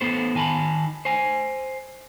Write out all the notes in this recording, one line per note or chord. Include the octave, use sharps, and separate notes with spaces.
B3 A4 C5
D#3 G#5 A5 B5
C5 G#5